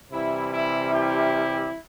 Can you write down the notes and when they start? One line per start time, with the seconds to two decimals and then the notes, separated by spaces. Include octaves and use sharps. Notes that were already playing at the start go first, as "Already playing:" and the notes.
0.11 C3 E3 G3 E4
0.51 E4
0.91 E4 G4